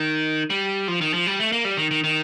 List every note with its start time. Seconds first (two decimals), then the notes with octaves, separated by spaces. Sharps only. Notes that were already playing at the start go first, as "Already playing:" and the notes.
Already playing: D#3
0.50 G3
0.88 F3
1.01 D#3
1.14 F3
1.27 G3
1.40 A3
1.52 A#3
1.65 G3
1.77 D#3
1.91 D#3
2.04 D#3